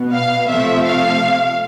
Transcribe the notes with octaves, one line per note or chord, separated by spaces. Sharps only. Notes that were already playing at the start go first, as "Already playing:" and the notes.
Already playing: B2 B3
F5
C3 F3 A3 E5
F5